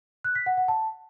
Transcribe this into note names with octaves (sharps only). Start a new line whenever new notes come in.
F#6
B6
F#5
F#5
A5